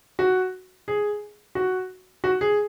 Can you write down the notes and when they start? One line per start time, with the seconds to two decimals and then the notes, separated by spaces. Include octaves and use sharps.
0.19 F#4
0.88 G#4
1.55 F#4
2.24 F#4
2.41 G#4